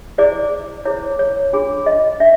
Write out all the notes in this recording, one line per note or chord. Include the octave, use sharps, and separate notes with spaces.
E4 G#4 C5 D5
E4 G#4 C5 C#5
C#5
D4 F4 G#4
D#5
D4 E5